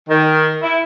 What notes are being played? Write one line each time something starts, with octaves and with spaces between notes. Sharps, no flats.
D#3
E4